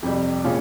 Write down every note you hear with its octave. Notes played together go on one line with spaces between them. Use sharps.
F2 C3 G3
A#2 G#3 C#4 F4